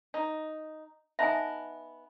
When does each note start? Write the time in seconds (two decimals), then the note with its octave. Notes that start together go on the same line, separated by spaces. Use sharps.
0.14 D#4
1.19 B3 D#4 E5 G#5 A5